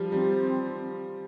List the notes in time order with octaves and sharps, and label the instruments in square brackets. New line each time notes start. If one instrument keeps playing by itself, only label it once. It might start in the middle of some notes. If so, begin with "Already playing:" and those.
Already playing: [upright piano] F3 G3
[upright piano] G3 [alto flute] C4